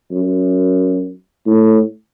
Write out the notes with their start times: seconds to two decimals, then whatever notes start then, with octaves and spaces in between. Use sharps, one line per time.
0.11 F#2
1.47 A2